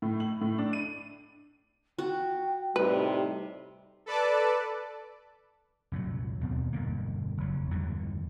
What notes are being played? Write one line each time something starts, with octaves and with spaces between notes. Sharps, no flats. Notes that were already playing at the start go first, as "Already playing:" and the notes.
A2
F#7
A2
D4
D#7
F#4 G5
A2 C3 G3 D#4 B4
A4 B4 D5 A5 D6
C2 F#2 A#2 F#3
D#2 B2 C4
E1 G2 D3 A#3
F#1 F2 F#3
E2 G2 D3 D#3